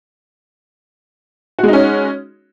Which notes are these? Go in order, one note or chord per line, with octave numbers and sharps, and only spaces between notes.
G#3 C#4 D#4 F#4